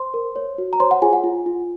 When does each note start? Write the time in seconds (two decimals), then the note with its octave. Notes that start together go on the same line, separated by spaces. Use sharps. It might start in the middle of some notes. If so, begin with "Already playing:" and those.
Already playing: C5 C6
0.14 A#4
0.36 C#5
0.58 F#4
0.73 A#5
0.80 C5 C#5 C6
0.91 F#5
1.02 F4 G#4 G#5
1.13 F#5
1.24 F4
1.46 F4